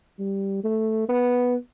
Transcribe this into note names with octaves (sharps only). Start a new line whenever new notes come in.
G3
A3
B3